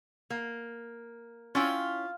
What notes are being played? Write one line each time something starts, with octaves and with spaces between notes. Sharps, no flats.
A#3
C#4 E4 F4 G5